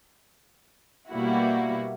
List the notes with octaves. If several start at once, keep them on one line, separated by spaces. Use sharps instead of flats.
B2 G3 A#3 E4 F#4